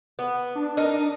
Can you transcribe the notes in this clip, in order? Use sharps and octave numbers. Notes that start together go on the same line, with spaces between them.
B3
D4
D#4 A#4